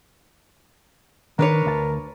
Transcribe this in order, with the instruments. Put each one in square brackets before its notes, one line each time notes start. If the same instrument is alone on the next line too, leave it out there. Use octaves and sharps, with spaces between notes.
[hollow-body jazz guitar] D#3 [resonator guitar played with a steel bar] D4 B4 C#5 [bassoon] A#4
[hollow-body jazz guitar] D2 A5